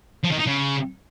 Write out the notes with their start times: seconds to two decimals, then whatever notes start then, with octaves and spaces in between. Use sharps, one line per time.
0.24 F3
0.32 D#3
0.39 D#4
0.47 C#3